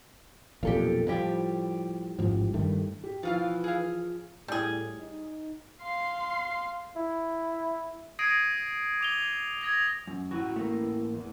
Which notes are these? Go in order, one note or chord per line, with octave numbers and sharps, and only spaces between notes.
B1 F2 A#2 G4 A4 F5
A2 F3 G3 G4
A1 G#2 F3
G2 D#3 A3
G4
B2 E3 F3 F4 F5
G#4 F5
A2 G3 G#4
D#4
F5 C6
E4
D#6 G#6 A#6 C7 D7 D#7
D6 F7 G7
D#6 G#6 A#6 F7
F#2
A2 E3 F#4
A3 A#3
E2